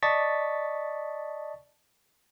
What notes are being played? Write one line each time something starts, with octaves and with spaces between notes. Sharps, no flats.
D5 D#5 A5 C#6 A6 B6